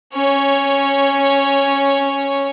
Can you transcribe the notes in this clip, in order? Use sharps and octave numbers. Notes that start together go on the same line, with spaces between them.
C#4 C#5